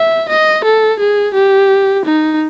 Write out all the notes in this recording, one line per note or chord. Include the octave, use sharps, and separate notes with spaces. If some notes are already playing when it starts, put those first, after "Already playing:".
Already playing: E5
D#5
A4
G#4
G4
D#4